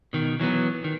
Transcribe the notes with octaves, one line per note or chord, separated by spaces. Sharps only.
B2 D#3
E3 F#3 A3 B3
D#3